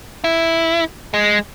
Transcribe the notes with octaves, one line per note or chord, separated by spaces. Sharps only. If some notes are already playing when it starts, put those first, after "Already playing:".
E4
G#3